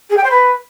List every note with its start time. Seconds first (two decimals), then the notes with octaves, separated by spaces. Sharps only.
0.09 G#4
0.16 G5
0.23 C5
0.30 B4